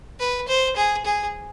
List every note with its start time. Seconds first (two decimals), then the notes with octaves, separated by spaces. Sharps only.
0.20 B4
0.48 C5
0.76 G#4
1.05 G#4